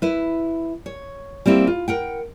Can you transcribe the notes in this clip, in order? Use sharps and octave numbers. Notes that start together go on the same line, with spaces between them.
E4 B4
C#5
G3 A#3 C4 E4
F4
A#4 F#5 G5